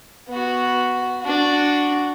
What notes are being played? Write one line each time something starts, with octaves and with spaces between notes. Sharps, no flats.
B3 F#4
D4 F#4